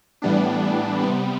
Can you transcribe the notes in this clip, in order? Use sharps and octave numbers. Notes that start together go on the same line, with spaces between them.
A2 E3 G3 B3 D4
C3 G3 B3